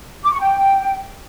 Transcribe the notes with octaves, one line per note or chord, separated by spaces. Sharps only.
D6
C#6
G5